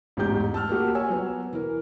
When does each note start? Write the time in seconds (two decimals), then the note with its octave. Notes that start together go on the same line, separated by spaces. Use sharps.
0.17 A1 E2 G#2 G4 G6
0.54 A5 E6 F6
0.69 A#3 F#4 G4
0.95 C#5 G#5 E6
1.09 F#3 B3
1.53 E3 A#4